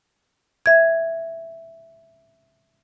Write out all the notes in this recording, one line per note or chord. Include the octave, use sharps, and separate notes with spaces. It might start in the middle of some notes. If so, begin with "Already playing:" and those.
E5 G#6